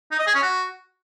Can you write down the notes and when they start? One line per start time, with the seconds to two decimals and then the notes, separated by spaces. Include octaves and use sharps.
0.11 D#4
0.19 D#5
0.27 G#4
0.35 C#4
0.42 F#4